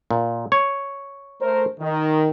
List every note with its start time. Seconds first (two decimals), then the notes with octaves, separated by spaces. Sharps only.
0.11 A#2
0.52 C#5
1.42 A3 A#4 C5
1.80 D#3